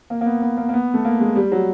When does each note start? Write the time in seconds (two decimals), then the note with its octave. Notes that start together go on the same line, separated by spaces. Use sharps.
0.10 A#3
0.21 A#3
0.26 B3
0.42 B3
0.57 A#3
0.69 A#3
0.73 B3
0.94 A3
1.05 A#3
1.20 G#3
1.36 G3
1.52 F#3